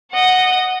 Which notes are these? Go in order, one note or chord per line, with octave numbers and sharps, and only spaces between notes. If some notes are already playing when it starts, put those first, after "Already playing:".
D#5 F#5